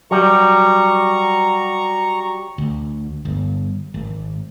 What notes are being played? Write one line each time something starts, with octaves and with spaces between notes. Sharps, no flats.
F#3 G3 A#5 C#6
D2
G1
G#1